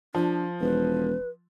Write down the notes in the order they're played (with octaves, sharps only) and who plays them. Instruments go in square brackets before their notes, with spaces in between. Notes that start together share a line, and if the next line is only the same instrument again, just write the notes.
[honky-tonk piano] F3 [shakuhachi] D4
[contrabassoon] E1 [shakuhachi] B4